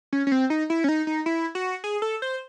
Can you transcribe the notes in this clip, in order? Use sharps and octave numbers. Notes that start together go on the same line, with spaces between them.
C#4
C#4
C4
D#4
E4
C#4
D#4
D#4
E4
F#4
G#4
A4
C5